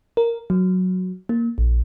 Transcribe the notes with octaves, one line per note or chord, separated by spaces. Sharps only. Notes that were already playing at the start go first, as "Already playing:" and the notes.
A#4
F#3
A#3
A#1